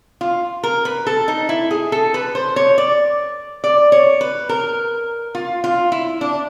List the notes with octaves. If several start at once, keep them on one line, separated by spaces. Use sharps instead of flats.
F4
A#4
B4
A4
D#4
E4
G#4
A4
B4
C5
C#5
D5
D5
C#5
B4
A#4
F4
F4
E4
D4